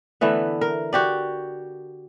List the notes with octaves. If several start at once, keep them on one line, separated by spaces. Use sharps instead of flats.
D3 E3 A3 B3
A#4
F#4 G4 D5